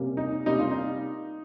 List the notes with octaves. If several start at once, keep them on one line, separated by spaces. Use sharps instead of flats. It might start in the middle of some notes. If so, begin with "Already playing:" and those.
Already playing: C3 G3 A#3 C#4
D#4
C3 G3 A#3 C#4 D#4
F4
D#4